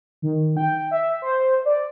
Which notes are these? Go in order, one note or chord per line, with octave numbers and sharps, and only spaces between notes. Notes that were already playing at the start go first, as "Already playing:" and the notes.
D#3
G5
E5
C5
D5